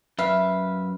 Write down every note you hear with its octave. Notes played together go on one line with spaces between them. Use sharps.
F#2 B4 E5 F5